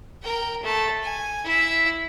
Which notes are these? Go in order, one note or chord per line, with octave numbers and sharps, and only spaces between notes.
A#4 G5
A3 A5
G#5
E4 E5